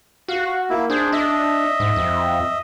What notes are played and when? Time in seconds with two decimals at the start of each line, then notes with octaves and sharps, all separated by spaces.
0.28 F#4 F5
0.70 A#3 E4
0.90 D4 G#4 C5
1.12 D4 D#5 E5
1.80 G#2
1.96 F2